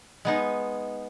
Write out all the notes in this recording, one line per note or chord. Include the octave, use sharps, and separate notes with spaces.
G#3 B3 D#4